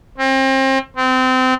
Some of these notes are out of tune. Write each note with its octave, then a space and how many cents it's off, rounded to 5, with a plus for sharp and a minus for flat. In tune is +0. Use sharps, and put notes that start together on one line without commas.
C4 +35
C4 -25